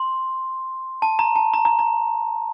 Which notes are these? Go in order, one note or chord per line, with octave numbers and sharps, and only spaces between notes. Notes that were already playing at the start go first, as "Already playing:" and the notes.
Already playing: C6
A5
A#5
A5
A#5
A#5
A#5